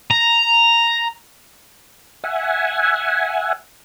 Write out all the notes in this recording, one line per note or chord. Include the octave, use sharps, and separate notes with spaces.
A#5
E5 F#5 G#5